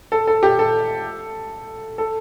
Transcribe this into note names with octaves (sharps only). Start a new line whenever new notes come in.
A4
A4
G4
A4
A4